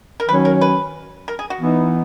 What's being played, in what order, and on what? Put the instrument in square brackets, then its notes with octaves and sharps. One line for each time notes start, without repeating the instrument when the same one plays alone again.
[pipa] A#4
[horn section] D#3 F#3 C#4 [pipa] B4
[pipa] A#4
B4
A#4
G#4
F#4
[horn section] E3 B3 D#4